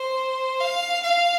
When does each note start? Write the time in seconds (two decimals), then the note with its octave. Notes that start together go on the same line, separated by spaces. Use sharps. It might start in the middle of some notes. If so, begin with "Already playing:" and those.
Already playing: C5
0.61 F5
1.03 F5